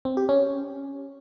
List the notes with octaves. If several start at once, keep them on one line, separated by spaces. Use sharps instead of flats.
C4
G4
C#4